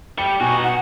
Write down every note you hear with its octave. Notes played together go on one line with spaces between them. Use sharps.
G3 G5 C#7
B2 D#4 F#4 G#5
F#5